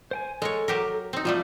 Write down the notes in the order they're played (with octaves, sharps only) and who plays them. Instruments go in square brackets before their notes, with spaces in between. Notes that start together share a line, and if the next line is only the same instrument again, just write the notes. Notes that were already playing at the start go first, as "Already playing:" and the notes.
[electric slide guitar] C5 G5 G#5
[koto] G#3 A#4 C#5 [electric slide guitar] A4
[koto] F#3 G4 A#4
C4 D#4
[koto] F3 G3 A3 [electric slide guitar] F4